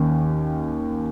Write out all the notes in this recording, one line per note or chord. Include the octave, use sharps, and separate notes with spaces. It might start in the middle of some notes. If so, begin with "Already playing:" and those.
Already playing: D#2 D#3 C#4